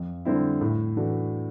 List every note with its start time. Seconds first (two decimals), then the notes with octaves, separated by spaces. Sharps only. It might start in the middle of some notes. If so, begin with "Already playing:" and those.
Already playing: F2
0.25 D3 G3 C4 E4
0.61 A2
0.97 E3 A3 D4 F#4